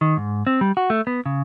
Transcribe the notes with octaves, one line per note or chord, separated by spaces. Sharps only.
D#3
G#2
C4
G3
F#4
A3
B3
C#3